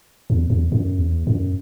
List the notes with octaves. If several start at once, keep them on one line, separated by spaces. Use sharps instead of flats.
E2
E2
F#2
E2
F#2